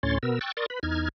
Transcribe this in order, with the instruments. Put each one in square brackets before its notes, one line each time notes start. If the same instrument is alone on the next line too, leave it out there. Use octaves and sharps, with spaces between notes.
[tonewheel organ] D2 A2 C#4 C#5 C6 A6
B2 B3 A#4 E6
G5 C#6 E6 F#6 A6
A#4 D5 C6 C#6 D#6 A6
B4 B5
E2 D#4 F6 G#6